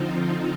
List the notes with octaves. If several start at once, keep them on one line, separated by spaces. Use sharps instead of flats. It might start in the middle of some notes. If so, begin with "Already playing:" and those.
Already playing: D3 F3 C4 D#4 F4